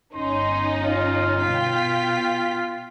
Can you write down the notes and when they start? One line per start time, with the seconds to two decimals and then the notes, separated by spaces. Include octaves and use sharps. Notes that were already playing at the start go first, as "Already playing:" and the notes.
0.15 G1 C#4 D#4 C6
0.82 F4
1.43 B2 G5 B6